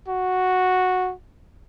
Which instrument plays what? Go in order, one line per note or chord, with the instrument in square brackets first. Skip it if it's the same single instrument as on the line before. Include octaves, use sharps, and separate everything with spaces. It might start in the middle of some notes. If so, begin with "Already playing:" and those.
[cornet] F#4